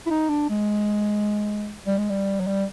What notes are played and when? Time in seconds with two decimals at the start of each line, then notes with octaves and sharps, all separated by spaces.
0.06 E4
0.10 D#4
0.29 D4
0.50 G#3
1.87 G3
1.98 G#3
2.10 G3
2.40 F#3
2.47 G3